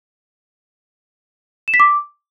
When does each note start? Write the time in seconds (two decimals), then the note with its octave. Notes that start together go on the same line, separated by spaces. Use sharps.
1.68 E7
1.74 B6
1.80 D6